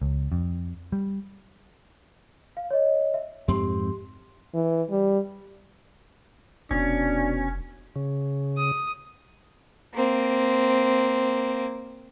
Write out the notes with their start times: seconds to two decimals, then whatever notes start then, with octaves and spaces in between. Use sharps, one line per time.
0.02 C#2
0.32 F2
0.92 G3
2.57 F5
2.70 C#5 D#5
3.14 E5
3.48 F2 G#2 C4 G4 C6
4.54 E3
4.91 G3
6.71 F1 B2 C#4 D4
7.96 C#3
8.57 D#6
9.94 A#3 C4